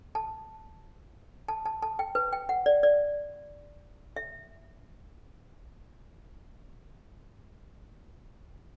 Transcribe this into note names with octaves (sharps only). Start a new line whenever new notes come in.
A5
A5
A5
A5
G5
B4
G5
F#5
D5
D5
E5